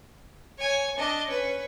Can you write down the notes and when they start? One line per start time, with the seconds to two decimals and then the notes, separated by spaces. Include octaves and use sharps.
0.58 C#5 G#5
0.97 D4 D#5
1.27 C#4 B4